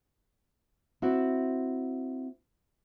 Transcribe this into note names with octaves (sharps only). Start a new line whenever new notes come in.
C4 E4 F#4